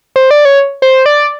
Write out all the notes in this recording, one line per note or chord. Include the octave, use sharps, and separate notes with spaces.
C5
D5
C#5
C5
D5